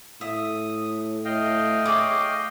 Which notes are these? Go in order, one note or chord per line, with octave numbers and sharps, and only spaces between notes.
A2 E5 D#6
A3 D#5 F5 G5
G#4 C#5 D6